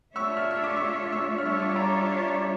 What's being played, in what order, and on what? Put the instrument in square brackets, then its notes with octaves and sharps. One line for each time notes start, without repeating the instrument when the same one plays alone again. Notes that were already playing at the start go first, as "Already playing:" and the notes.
[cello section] A3 D4 F4 C#5 E5 [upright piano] C#6 E6
[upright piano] F6
E6
D6
C#6 E6
C#6 E6
F6
[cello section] G3 D4 F4 C#5 E5 [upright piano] C#6 E6
[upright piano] D6
E6
A#5 D6